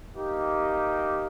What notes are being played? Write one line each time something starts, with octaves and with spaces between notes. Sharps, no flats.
A#3 D#4 G4